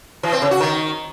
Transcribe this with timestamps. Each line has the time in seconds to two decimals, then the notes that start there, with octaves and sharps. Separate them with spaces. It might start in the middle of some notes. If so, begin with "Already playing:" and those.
0.23 E3
0.33 C4
0.42 C#3
0.51 F#4
0.60 D#3